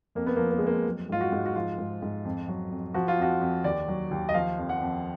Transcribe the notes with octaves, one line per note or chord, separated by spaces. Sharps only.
F2 A#3
B3
F3 A#3
A#3
G#3
F2 A#3
F#3
G#2 F4
F#4
G#2
F#4
F3 F4
G#2
G#2
F2
F#3
F2
F3 F#4
F4
F2 F#4
F2
D#2 D5
F#3
D#2
D#5
F3 F5
F2
F#5
F2